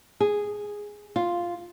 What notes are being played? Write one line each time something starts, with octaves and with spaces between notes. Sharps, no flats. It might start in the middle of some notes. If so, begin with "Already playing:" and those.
G#4
F4